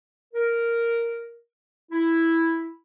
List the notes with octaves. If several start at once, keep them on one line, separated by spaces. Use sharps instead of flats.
A#4
E4